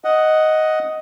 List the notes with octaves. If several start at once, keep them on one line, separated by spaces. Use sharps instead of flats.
D#5 F#5